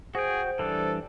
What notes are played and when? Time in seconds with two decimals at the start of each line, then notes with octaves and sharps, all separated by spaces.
0.15 F#4 G#4 C5 G5
0.59 E3 G3 D4 A4